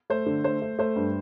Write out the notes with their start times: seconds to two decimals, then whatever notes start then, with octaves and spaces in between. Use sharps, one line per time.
0.10 A3 C5
0.26 D3
0.44 A3 C5
0.62 A3
0.79 A3 C5
0.96 G2